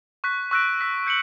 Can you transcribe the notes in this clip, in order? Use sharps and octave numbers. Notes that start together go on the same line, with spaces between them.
C#6 F#6 B6
C#6 E6 F#6 A#6 D7 E7
E6 B6
G6 C#7 D7 F#7